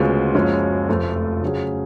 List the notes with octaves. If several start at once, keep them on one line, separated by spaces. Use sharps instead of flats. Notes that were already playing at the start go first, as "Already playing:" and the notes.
Already playing: D2 C#3 G#3 B3 F4
F#1 F#2 F3 G#3 C#4
F1 F2 F3 A3 F4
C#3 F#3 C#4 G#4